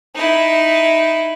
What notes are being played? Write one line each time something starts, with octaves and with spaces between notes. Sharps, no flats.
D#4 E4